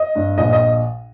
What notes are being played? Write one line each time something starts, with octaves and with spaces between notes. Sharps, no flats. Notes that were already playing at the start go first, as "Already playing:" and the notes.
Already playing: D#5
G2
A#1 D#5
D#5